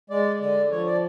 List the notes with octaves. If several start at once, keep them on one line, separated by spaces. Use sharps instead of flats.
G#3 D5
D3 D5
F3 C#5
D5